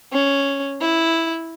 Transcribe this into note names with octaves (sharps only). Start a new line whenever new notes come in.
C#4
E4